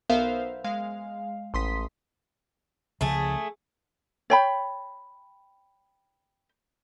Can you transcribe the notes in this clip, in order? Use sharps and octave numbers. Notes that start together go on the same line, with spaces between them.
B1 B3 A#4 C5 E5 F5
G#3 F5
A1 C6 D#6 B6
C#2 C#3 F3 A3 G#4
C#5 G5 B5